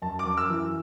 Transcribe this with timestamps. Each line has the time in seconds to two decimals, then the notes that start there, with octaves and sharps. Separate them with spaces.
0.02 F#2 A5
0.19 D6
0.25 F#2
0.37 E6
0.49 E3